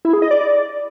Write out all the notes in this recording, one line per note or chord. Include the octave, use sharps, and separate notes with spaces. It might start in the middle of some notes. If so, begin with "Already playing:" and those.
E4
G#4
D#5
D5